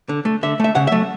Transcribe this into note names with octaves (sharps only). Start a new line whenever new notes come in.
D3
A3
D3 E5
A3 E5
C#3 F#5
E5
F#3 A3